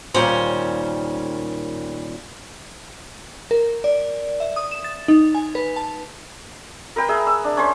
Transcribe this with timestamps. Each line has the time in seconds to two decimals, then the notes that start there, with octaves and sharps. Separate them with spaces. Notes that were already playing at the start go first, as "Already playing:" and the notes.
0.14 D#2 A#2 G3 C#4 C5 F5
3.51 A#4
3.84 D5
4.40 E5
4.56 D#6
4.71 E7
4.84 A6
5.08 D#4
5.35 G#5
5.55 B4
5.76 A5
6.96 A#4 B4 G5
7.09 G#4 E5
7.27 E6
7.44 D4
7.57 C#4 C5